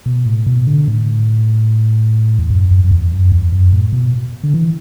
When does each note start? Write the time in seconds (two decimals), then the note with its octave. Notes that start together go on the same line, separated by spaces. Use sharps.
0.06 B2
0.26 A2
0.47 B2
0.67 D3
0.88 A2
2.39 E2
2.50 F#2
2.71 F#2
2.84 F#2
2.91 E2
3.12 F#2
3.32 E2
3.52 F#2
3.72 A2
3.93 B2
4.43 D3
4.54 E3